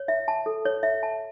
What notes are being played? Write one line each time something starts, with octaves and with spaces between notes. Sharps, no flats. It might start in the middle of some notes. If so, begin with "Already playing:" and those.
Already playing: C#5
E5
A5
A4
C#5
E5
A5